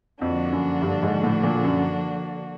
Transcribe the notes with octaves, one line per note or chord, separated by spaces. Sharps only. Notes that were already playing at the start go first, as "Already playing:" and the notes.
F2 D3 F3 A#3 D4 F#4
F#2
G2
G#2
A2
A#2
F#2